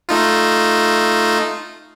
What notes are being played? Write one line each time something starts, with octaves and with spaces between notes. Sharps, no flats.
A3 D#4 F4